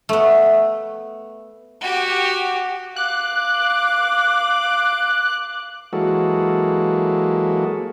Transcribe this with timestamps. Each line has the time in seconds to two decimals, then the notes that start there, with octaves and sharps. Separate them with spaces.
0.09 A3 B3
1.81 F#4 G4
2.96 F5 D6 F#6
5.93 E3 F#3 G#3 A#3 F#4 A4